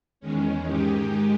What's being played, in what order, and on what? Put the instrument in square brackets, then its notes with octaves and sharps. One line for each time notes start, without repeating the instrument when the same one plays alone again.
[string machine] E2 D#3 G#3 C#4
G#2 D#3 G#3 D#4 G4